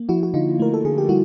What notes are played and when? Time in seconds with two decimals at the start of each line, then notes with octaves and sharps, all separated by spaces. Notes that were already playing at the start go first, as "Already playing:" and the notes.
Already playing: A#3
0.09 F3 E4 F#4
0.23 F#4
0.34 D3 D#4 F4
0.60 A3 A#4
0.74 A4
0.85 D3 G#4
0.98 G4
1.09 G3 E4 F#4